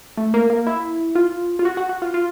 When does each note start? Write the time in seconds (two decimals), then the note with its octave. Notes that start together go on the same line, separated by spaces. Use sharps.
0.17 A3
0.34 A#3
0.50 A#3
0.67 E4
1.15 F4
1.59 F4
1.65 F#4
1.77 F#4
1.89 F#4
2.02 F4
2.14 F4